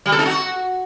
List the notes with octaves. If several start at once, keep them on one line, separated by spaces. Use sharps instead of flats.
G3
A4
D#4
F#4